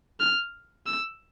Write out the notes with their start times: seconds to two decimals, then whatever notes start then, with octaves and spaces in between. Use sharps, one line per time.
0.20 F6
0.87 E6